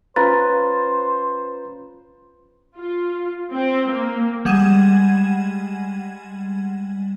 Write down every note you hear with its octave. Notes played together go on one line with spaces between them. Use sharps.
C#4 F4 B4 C5 A#5 A6
F4
C4
A#3
G3 G#3 F#5 G#6 D#7 E7